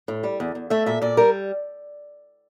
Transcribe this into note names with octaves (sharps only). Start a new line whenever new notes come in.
A2
G3
E2
E2
A3 E5
A#2 E5
A#2 D5
G3 A#4